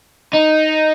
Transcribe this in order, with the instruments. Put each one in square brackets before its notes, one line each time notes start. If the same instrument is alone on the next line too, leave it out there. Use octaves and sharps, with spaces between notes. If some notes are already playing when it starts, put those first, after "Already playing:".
[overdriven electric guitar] D#4